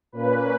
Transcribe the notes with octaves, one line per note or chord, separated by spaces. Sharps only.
A#2 A#3 C#4 B4